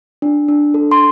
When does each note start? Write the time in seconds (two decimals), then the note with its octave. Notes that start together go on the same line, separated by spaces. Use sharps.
0.22 D4
0.48 D4
0.74 A4
0.91 C6